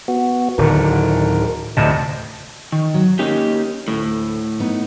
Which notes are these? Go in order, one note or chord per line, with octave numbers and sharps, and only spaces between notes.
B3 F#4
D1 D3 D#3 A#4
D2 A2 C3 D#5 A5
D#3
F#3
A#3 C#4 D#4 G4
D2 A2
B3 D#4